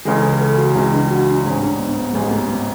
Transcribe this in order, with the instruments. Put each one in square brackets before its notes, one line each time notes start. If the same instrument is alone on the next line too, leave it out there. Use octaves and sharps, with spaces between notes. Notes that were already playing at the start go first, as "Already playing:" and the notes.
[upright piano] C#2 C#3 E3 G#3 [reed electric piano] A4
[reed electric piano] B4
A4
F#4
[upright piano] C#2 C#3 E3 G#3 [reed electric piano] E4
[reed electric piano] D4
F#4
D4
[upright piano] A1 G#2 G#3 C#4
[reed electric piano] D4
B3
B3
[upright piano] A1 G#2 G#3 C#4 [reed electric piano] A3
[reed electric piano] B3
B3